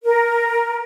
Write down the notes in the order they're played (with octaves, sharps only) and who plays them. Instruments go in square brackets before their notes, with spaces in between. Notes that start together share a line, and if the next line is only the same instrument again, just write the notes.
[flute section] A#4